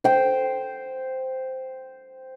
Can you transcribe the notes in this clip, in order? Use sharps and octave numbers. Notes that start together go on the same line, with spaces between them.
C5 G5